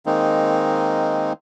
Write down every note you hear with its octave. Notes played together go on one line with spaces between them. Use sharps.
D#3 G#3 A#3 C4 D#4